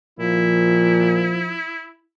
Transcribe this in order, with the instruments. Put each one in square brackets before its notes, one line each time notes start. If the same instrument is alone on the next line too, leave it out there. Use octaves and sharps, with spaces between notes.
[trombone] A#2 [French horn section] F3 [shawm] E4